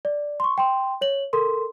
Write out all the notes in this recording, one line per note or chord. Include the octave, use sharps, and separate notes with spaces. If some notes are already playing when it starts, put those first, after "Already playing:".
D5
C6 C#6
G5 C6
C#5 F#7
A4 A#4 C6